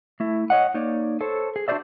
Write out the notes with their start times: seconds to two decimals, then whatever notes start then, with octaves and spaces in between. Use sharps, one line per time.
0.20 A3 E4
0.50 C#5 D#5 F#5
0.74 A#3 D#4 C#5 D5
1.21 A4 C5 C#5
1.56 G#4
1.68 D4 F#4 G4 C5 D5 E5